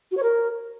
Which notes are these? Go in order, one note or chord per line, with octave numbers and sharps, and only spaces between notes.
F#4
C#5
A#4